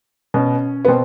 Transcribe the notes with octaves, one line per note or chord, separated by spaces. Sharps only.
B2 C#4
B3
B2 C4